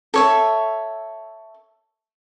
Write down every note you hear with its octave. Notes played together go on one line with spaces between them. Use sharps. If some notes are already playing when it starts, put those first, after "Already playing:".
A4 C#5 E5